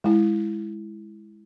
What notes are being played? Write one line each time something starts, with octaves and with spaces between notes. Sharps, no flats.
G#3 E4